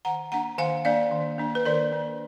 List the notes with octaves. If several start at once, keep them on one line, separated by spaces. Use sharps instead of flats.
D#3 F#5 A#5
A#3 D4 F#5 A#5
D#3 F5 G#5
A#3 D4 D5 F5
D#3
A#3 D4
B4
D#3 A#4 D5
A#3 D4